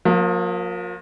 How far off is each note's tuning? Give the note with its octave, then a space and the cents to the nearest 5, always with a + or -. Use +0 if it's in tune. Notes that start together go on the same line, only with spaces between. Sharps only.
F3 +45 A#3 +0